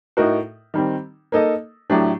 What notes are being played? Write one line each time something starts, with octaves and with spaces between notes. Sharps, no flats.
A2 A3 D#4 F#4 A#4
D#3 G3 C4
A#3 D#4 A4 D#5
A2 F#3 A3 D4 G4